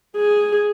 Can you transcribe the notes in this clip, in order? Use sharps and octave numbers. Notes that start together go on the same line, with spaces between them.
G#4